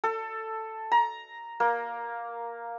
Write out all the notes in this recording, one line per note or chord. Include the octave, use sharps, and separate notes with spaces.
A4
A#5
A#3